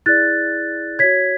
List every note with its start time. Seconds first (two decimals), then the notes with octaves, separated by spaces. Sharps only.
0.06 E4 G#4 D5 F#6 A6
0.99 F#4 C#5 G#6 B6